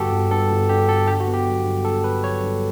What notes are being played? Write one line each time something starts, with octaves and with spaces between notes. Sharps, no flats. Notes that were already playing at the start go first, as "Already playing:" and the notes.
Already playing: G1 G2 D3 F#4 G4 A4
G1
G2 A4
G1
D3 G4
G1 A4
D3 G4
F#4
B3
G4
F#3
G2
D3 A4
B3 B4
F#3 C#5
G2